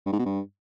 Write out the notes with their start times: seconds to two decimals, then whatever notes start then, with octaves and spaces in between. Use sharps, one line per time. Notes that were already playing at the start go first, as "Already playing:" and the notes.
0.06 G2
0.13 G#2
0.19 B2
0.26 G2